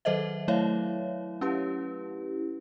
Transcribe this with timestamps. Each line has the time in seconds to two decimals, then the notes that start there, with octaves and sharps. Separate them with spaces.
0.05 D#3 F#3 A4 C5 D#5 E5
0.48 F#3 A3 E4 C#5 E5 F5
1.41 C#4 E4 G4 B4